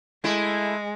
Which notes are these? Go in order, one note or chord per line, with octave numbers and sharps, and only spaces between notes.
G#3 A3 E4